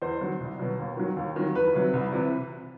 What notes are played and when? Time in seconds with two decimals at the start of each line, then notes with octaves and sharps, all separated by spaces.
0.02 E2 C5
0.21 D#3 F#3
0.40 C2
0.59 B2 F#3
0.79 D#2
0.97 D#3 F#3
1.17 D#2
1.36 D#3 F#3
1.55 E2 B4
1.74 C3 F#3
1.93 C2
2.12 C3 E3